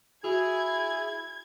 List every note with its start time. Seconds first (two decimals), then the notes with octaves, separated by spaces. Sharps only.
0.24 E4 F#4 G#4 G#6